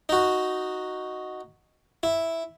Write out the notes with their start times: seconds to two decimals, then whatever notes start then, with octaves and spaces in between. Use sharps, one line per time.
0.09 D#4 F#4
2.03 E4